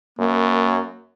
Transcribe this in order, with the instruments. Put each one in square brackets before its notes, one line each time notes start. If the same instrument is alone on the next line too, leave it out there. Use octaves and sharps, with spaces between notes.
[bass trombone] F#2 [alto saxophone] A#3